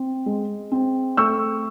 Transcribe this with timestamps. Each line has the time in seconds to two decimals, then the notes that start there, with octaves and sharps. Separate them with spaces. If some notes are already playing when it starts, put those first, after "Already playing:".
Already playing: C4
0.26 G#3
0.72 C4
1.17 A3 C#6 E6